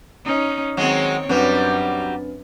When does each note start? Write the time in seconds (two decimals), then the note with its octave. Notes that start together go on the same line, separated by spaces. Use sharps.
0.25 C#4 D#4
0.77 D#3 F#3 G#3 C4 C#5
1.29 F#2 F#3 G3 C4 D4 B4